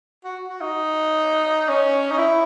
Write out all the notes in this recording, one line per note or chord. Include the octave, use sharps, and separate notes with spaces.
F#4
F#4
D#4
C#4
D#4
E4